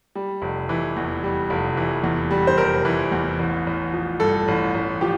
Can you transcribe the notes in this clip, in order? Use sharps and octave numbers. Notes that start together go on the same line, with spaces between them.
G3
F1
E3
E2
G3
F1
E3
E2
G3
C5
F1 A#4
E3
E2
A1
A1
F3
G2 A4
A1
A1
F3 G4